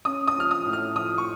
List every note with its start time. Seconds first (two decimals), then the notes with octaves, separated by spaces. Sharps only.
0.05 C#4 D#6
0.28 D#6
0.36 F3 F6
0.51 D#6
0.65 A2
0.73 F6
0.96 F3 D#6
1.18 C#6